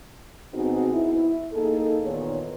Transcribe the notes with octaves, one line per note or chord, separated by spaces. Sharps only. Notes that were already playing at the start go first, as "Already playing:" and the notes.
B2 B3 C4 D#4 F#4 G#4
E4
A#3 D#4 G#4 A4
E2 A#2 D#3 B3 C#5